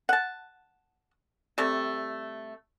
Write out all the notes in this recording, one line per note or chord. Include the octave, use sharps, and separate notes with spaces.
F#5 A5
C3 G3 A3